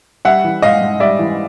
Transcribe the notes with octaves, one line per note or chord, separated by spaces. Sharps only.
G3 E5 F#5
E3
G#2 D#5 F5
G#2
G3 D5 E5
E3